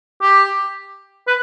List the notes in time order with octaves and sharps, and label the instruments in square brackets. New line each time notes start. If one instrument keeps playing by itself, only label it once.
[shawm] G4
B4